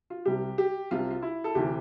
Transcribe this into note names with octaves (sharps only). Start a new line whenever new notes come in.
F4
C2 C3 G3 G4
G4
C2 C3 G3 F4
F4
E4
A4
D2 C3 E3 G4